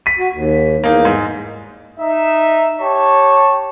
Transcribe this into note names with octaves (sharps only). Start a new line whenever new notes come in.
B6 D#7
F#4
D#2
E2 A#3 D#4
G#2
D#4 E5
G4 C#5 A5 C#6